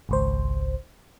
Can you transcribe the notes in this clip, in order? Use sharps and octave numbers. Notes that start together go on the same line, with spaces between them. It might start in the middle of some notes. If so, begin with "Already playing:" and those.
G#1 C#2 C5